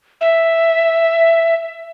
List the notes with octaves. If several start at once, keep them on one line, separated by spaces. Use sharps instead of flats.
E5